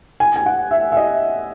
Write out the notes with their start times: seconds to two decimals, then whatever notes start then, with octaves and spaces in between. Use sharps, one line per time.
0.20 G#5
0.36 G#5
0.46 F#5
0.71 E5
0.92 E5
0.97 D#5